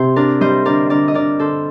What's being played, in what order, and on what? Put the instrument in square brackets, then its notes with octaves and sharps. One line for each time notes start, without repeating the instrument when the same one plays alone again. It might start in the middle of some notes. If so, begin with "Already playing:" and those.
Already playing: [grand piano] C3 [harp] G4 C5
[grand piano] D4 [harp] A#4 D5
[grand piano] G3 [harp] C5 D#5
[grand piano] D3 [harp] A#4 D5
[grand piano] D3 [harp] A#4 D5
[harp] D#5
[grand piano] D3 [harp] A#4 D5
[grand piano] D3 [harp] A4 C5